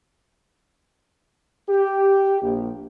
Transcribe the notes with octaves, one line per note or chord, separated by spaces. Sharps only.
G4
A#1